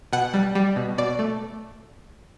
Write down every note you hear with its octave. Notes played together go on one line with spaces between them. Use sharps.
B2 F#5
G3
G3
B2
B2 D5
A3